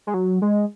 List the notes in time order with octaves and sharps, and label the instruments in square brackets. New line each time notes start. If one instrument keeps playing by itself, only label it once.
[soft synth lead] G#3
F#3
G#3